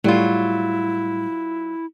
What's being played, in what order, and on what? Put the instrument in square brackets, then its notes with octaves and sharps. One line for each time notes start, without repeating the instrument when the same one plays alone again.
[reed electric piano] A2 G3 [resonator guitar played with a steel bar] F#3 F4 [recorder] E4